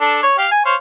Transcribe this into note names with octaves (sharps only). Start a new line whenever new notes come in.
D4 A4
C#5
G4 F5
G#5
C5 C#5 F5